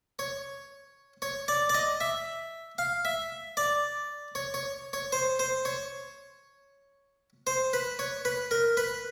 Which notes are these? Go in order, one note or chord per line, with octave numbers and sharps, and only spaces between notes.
C#5
C#5
D5
D5
D#5
E5
F5
E5
D5
C#5
C#5
C#5
C5
C5
C#5
C5
B4
C#5
B4
A#4
B4